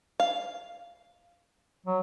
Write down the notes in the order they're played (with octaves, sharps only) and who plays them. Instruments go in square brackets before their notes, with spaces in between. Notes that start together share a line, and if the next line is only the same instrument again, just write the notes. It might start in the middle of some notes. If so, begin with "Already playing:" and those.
[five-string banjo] F5
[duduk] F#3